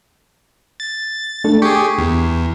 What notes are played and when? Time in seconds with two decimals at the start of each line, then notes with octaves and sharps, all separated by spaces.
0.80 A6
1.44 A3 D4 A4
1.62 G4 G#4 C#6
1.98 E2